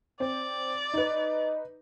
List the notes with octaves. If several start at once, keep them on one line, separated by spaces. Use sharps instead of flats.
C4 D5
D#4 B4 D#5